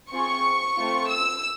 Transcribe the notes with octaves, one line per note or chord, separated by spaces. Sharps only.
C4 F4 G#4 C#6
A3 C4 F4
E6